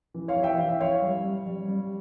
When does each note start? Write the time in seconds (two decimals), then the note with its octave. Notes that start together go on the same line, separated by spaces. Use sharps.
0.14 E3
0.28 C#5 F5
0.36 E3
0.43 E5 G5
0.58 E3 F5
0.69 E5
0.80 E3 C#5 F5
1.02 G3
1.24 G3
1.46 G3
1.68 G3